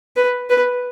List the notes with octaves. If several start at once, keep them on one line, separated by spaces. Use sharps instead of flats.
B4
B4